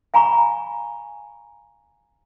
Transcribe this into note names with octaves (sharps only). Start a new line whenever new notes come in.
F5 G#5 A#5 B5 C#6